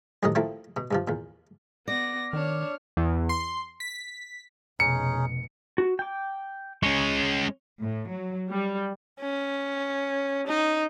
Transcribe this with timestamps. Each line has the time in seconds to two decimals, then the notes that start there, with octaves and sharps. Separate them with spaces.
0.23 F2 A2 C3 D#3 F#3 D#5
0.35 F3 A3 A#3 C4 E4
0.77 B2
0.91 G2 C3 F3
1.08 E2 A#2
1.88 B3 D5 A#6
2.33 D#3 D4 C#5 F6
2.97 E2
3.29 C6
3.80 B6
4.80 F1 B2 C#4 D#4 G#4 C#7
5.78 F#4
5.99 G5 D6
6.83 G#3 C#4 C#6
7.80 A2
8.10 F#3
8.51 G3
9.20 C#4
10.47 D#4